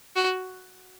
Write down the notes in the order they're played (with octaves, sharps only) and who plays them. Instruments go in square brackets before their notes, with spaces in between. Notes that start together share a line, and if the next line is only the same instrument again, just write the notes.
[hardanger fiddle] F#4